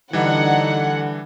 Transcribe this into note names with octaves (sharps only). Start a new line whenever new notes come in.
D3 E3 G3 D#4 F#5